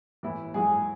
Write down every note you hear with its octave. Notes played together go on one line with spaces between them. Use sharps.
A2 E3 E4
F#3 G#3 G#4